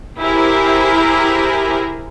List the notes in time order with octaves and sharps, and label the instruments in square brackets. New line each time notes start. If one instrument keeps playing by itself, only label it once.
[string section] E4 G4 G#4 A#4 C5